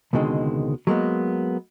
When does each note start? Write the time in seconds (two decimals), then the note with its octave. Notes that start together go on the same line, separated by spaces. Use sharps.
0.13 C#2 B2 D3 D#3 G#3 C4
0.87 F#3 G#3 A#3 B3